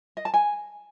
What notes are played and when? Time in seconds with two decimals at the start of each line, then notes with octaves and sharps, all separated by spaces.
0.17 D#5
0.25 A5
0.34 G#5